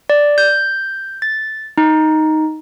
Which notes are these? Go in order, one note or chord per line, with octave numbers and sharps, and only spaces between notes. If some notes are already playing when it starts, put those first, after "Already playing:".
D5
G6
A6
D#4